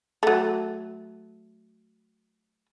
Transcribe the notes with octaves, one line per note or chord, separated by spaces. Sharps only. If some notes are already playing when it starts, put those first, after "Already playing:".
F#3 A3